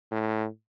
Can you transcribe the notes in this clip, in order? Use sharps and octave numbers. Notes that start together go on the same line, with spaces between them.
A2